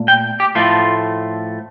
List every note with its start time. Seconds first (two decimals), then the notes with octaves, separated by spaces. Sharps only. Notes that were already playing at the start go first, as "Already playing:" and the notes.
Already playing: A#2 A3
0.08 G5
0.40 G4
0.55 A2 F3 A3 F4